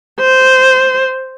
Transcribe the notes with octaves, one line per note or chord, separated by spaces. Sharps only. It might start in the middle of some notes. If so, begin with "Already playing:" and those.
C5